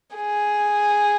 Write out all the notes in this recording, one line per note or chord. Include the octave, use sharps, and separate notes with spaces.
G#4